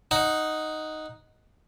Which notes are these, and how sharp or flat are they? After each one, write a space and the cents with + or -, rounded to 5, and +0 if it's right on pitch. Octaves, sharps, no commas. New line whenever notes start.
D#4 +0 F#5 +0